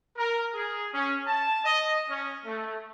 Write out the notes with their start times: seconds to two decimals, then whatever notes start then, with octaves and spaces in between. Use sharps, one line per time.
0.17 A#4
0.54 G#4
0.94 C#4
1.27 A5
1.64 D#5
2.09 C#4
2.45 A3